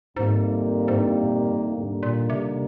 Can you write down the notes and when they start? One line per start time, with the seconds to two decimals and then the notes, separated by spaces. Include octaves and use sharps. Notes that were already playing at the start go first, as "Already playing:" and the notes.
0.17 F2 G#2 C3 D#3 G3 A#3
0.88 G#2
0.97 G2
1.23 A#2
1.50 G2
1.77 D#2 G#2 D3 G3 A#3
2.03 A#2
2.30 C3